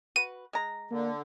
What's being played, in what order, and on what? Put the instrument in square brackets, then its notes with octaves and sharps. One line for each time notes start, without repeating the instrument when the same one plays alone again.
[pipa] F#4 B4 [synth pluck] D#7
[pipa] G#3 A#5
[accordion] D3 [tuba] A#3